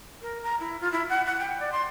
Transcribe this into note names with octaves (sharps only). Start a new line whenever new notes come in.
A#4
A#5
E4
F4
E4
F#5
F#5
G5
D5
C6